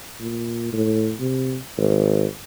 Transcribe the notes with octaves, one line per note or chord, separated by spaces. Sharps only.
A#2
A2
C3
G#1